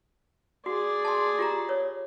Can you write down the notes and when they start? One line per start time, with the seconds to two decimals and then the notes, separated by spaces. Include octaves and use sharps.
0.66 F#4 G#4 D5
1.05 A5 C6
1.39 F4 G4 A#5
1.69 C#5